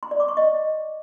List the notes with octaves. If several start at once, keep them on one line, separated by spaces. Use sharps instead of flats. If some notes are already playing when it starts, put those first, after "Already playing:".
C6
D5
D6
C#6
D#5